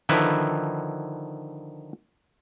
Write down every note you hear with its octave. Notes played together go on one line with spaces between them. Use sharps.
D3 D#3 F3 E4 B4